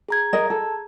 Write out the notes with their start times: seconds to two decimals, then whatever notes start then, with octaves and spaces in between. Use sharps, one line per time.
0.08 G#4 A#5 G#6
0.33 A#4 D#5
0.50 A4